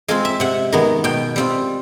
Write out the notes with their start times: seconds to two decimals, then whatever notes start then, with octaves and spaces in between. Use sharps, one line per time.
0.08 G#3 C4 F4 F5
0.25 E5
0.40 C3 F#5
0.72 D#3 G#3 B3
1.04 B2 G5
1.36 G3 C4 F4